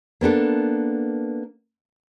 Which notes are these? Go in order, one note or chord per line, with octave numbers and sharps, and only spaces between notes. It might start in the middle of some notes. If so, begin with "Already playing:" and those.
A#3 B3 D4 A4